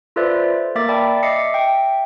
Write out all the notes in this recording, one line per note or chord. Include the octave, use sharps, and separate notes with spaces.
F4 A4 B4 C5 D5 E5
C5
A#3 A#4 E5 D6 A6
D5 G5 A5 B5
D#5 E5 D6 C7 C#7
E5 G5